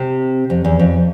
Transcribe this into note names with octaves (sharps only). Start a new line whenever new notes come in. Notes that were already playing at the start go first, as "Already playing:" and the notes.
Already playing: C3
F2
E2
F2